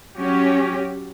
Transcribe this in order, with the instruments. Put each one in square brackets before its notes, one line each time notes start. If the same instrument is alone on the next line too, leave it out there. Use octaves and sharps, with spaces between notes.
[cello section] F#3 C#4 F#4 G4